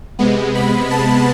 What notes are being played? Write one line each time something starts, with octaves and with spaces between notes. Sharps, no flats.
C3 G#3 B3
B5
A5